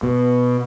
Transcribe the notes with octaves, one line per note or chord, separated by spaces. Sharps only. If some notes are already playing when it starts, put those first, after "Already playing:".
B2